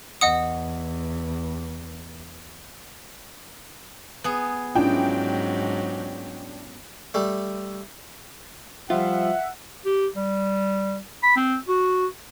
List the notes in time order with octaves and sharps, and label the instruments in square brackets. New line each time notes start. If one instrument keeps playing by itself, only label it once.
[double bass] E2 [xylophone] D#5 F#5 D#6
[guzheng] B3 G#4
[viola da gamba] G#2 F#3 [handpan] C#4 E4 F4 [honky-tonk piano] D4 G5
[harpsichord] G3 A3
[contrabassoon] F3 [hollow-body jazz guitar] G3 F4 [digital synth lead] E5 [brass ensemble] F#5
[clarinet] G4
G3
B5
C4
F#4